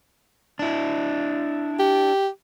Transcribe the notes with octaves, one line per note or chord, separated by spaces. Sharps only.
D4 E4
G4